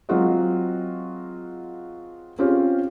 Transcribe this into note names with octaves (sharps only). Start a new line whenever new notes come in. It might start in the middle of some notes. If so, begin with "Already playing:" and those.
F#3 G#3 C4 F4 F#4 D#5
C4 C#4 F4 G4 G#4 C#5